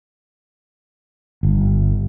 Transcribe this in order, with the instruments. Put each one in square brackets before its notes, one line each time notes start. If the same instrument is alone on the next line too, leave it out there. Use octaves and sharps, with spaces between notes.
[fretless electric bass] G1